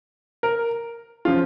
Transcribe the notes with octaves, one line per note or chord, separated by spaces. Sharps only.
A#4
C#3 F3 F4